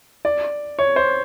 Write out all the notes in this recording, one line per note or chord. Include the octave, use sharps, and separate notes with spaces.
D5
C#5
C5